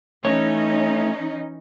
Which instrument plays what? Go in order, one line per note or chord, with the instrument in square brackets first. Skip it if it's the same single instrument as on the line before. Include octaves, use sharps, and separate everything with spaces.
[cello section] E3 C#4 D#4 [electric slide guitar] A3 C#5